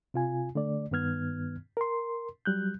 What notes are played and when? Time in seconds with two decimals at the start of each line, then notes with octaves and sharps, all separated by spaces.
0.14 C3 F4 G#5
0.55 D3 A3 D5
0.91 G2 D#3 B3 F6 G#6
1.77 A#4 C6
2.45 F#3 G3 F#6 G6